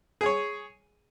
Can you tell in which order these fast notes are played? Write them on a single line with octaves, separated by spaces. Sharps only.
G#4 G#5 C#5